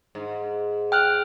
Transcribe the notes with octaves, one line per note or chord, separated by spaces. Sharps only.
G#2
G5 F6 F#6